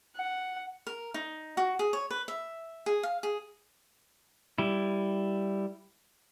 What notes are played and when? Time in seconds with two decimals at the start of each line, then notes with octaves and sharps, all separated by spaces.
0.16 F#5
0.87 A#4
1.14 D#4
1.57 F#4
1.79 G#4
1.93 C#5
2.11 B4
2.28 E5
2.86 G#4
3.03 F5
3.23 G#4
4.58 G3 E4